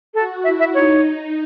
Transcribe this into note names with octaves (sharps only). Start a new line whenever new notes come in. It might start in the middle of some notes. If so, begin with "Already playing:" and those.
F#4 A4
E4 E5
E5
D#4 C#5